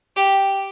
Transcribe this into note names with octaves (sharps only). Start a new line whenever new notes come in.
G4